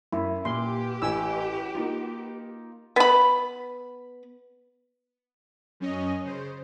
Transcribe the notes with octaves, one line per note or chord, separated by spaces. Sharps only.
F#2 E4
A#2 G4 B4 C6
A1 G#5 E6
A#3 D#4 F4
B3 B5
F#2 C#4 D#5
C#3 C5